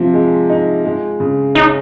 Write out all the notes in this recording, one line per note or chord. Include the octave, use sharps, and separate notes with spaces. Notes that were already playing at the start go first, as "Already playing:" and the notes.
Already playing: C3 F3 F4
G#3
D#4
G#3
C#3
C#4 D#4